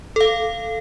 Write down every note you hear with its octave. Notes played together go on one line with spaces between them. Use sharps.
A4 F5